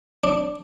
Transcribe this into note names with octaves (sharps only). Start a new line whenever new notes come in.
D4